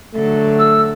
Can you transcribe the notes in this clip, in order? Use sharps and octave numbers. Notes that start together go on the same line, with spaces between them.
D3 F#3 A3 A4
E6